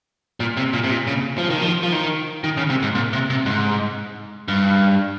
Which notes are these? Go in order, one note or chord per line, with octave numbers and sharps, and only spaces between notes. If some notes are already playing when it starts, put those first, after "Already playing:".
A#2
C3
A#2
C3
A#2
C#3
F3
D#3
F3
F3
D#3
D#3
C#3
C3
G#2
A#2
C3
C3
G#2
G2